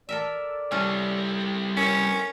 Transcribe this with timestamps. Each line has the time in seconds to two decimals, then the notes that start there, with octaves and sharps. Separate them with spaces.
0.09 A4 A#4 D5 E5
0.72 G3 C#4 E4 A4
1.77 C#4 A#4 E5